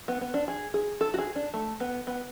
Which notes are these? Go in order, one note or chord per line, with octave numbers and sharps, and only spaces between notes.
B3
B3
D4
G#4
G#4
A4
F#4
G#4
D4
A3
B3
B3